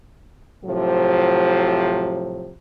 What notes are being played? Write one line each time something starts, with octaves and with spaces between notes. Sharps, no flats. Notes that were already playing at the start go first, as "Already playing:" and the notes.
A2 C3 F3 F#3